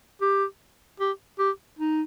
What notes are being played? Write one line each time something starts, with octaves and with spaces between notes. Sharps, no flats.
G4
G4
G4
D#4